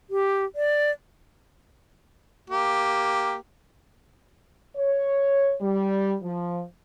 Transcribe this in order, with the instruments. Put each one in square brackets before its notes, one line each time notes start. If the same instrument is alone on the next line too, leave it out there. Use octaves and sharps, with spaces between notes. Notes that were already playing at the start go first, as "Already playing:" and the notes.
[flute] G4
D5
[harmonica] A#3 G4
[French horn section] C#5
G3
F3